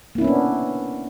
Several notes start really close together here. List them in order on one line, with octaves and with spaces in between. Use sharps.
A#3 E4 C#4 B3 D4